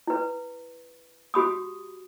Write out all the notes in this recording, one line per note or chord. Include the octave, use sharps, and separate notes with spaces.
E4 B4
F#4 G4 B5 D#6